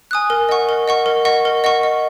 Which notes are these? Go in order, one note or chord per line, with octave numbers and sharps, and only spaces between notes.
G#5 D#6 F#6
A#4
D#5 F#5 C#6
A#4
D#5 F#5 C#6
A#4
D#5 F#5 C#6
A#4
D#5 F#5 C#6
D#5